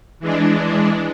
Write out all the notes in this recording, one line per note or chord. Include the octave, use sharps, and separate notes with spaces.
E3 G#3 D4